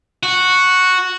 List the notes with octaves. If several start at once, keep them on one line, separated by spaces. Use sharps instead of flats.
F#4